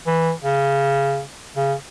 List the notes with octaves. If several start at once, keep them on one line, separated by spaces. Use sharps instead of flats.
E3
C#3
C#3